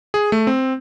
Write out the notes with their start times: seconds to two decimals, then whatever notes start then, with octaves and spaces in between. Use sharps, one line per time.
0.14 G#4
0.32 A3
0.47 C4